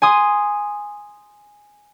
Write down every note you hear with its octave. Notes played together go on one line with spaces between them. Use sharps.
G#5 C6 D#6